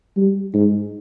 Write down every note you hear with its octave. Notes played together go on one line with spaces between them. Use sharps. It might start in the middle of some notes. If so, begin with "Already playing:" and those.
G3
G#2